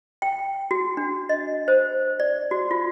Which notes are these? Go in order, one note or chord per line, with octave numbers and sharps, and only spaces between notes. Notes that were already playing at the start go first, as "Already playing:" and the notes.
G5
F#4
D4
D#5
C5
D5
F#4
F4